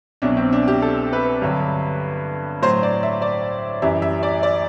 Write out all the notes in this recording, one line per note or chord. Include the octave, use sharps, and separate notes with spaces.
C2 B2 F#3 D4
C4
D4
G4
A4
B4
G2 D3 F#3
A2 F#3 C5
D5
E5
D5
F#2 E3 G3 E5
E5
D5
D5